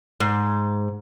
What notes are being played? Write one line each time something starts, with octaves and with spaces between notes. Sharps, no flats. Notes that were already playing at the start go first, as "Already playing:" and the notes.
G#2